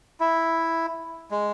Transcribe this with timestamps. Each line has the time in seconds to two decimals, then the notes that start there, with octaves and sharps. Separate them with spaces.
0.20 E4
1.31 G#3